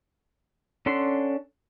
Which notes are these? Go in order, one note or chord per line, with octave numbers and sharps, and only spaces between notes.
C#4 D4 A4 F#5 C6